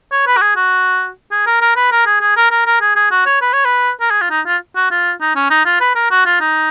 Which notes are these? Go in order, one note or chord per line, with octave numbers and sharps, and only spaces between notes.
C#5
B4
F#4
G#4
F#4
G#4
A#4
A#4
B4
A#4
G#4
G#4
A#4
A#4
A#4
G#4
G#4
F#4
C#5
B4
C#5
B4
A#4
G#4
F4
D#4
F4
F#4
F4
D#4
C#4
D#4
F4
B4
A#4
F#4
F4
D#4